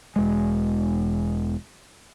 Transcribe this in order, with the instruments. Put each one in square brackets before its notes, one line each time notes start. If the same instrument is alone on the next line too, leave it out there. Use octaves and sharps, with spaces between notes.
[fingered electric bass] E1 G#3